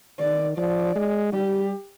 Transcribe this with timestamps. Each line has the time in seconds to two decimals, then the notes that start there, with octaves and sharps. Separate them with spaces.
0.19 D#3 D5
0.57 F3 D5
0.95 G#3
1.33 G3 G4